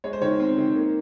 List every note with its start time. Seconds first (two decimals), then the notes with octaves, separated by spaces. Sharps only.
0.04 G#3 C#5
0.13 C5
0.21 D#3 C#5
0.40 C4
0.58 D#3
0.76 A#3